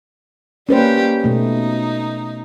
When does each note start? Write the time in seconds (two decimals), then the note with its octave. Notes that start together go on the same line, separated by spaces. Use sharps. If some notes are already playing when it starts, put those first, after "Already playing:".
0.69 G3 A#3 C#4 G4 B4 C5
1.24 B2 A3 D#4